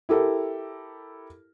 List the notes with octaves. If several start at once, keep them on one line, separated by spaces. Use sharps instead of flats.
E4 G4 A4 A#4